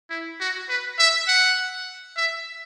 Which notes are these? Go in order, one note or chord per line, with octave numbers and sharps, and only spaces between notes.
E4
F#4
B4
E5
F#5
E5